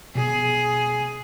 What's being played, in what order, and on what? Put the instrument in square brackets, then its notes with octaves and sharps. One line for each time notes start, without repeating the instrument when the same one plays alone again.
[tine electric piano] B2 [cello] G#4